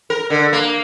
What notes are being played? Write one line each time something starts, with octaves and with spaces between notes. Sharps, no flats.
A#4
D3
A#3